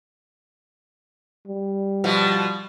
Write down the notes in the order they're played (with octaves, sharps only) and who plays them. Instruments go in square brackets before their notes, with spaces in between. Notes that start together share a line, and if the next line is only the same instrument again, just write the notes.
[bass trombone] G3
[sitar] B2 F3